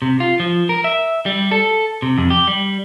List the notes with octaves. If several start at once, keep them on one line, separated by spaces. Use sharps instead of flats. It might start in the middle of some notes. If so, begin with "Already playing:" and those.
C3
F4
F3
A#4
E5
G3
A4
C3
F2
G4
G3